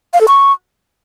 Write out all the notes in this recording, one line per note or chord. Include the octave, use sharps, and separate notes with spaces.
F5
A4
C#6